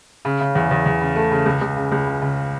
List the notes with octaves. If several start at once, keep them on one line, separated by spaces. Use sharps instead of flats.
C#3
C#3
E2
E2
E2
C#3
A3
C#3
C#2
C#2
C#3
C#2
C#3
C#3